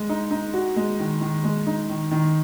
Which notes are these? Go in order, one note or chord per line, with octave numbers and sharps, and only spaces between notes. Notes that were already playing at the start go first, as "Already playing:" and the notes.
Already playing: G#3
D#4
D#4
F#4
G#3
D#3
D#3
G#3
D#4
D#3
D#3